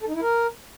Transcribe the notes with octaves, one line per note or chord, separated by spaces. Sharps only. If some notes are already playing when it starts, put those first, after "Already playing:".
A4
D#4
E4
A#4